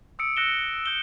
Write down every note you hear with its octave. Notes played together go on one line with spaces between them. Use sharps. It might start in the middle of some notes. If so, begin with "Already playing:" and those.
D#6 E6 C#7 D7
E6 F#6 A#6 C#7 E7 G7
E6 G6 G7